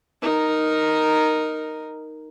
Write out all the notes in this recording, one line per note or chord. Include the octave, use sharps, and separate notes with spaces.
D#4 A#4